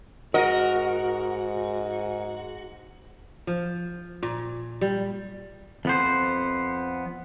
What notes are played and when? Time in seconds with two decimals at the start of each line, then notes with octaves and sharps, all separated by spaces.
0.34 G#2 F#4 A#4 D#5
3.47 F3
4.23 A#2
4.81 G3
5.85 F2 B3 C5